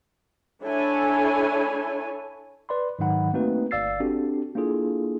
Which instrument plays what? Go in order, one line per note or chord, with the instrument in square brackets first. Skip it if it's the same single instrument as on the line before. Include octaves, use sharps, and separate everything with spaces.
[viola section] D4 E4 A4 C#5 G#5
[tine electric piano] B4 D5 B5 C6
G#2 D#3 F#3 D#4 F#5 B5
A3 A#3 C4 D#4 F#4 B4
G1 D5 F5 E6 A6 C7
C4 D4 F#4 G4 A4
A#3 D4 E4 F4 G#4 A4